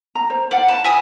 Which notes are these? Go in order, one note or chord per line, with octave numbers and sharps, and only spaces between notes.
A#5
C5
C5 D5 F5 F#5
A5 B5
E5 G#5 D#6